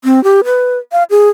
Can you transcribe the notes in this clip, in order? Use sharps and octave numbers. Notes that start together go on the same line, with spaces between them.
C4
G4
B4
F5
G#4